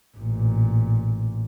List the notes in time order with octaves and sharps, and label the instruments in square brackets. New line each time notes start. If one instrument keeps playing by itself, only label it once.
[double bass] A1 A#2